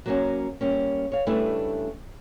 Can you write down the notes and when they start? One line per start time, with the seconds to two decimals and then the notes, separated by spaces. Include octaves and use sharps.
0.06 F#3 G3 A#3 C4 C#4 F#4
0.61 G3 A#3 C#4
1.12 C#5 F5
1.26 C#3 G3 A3 D4 E4 B4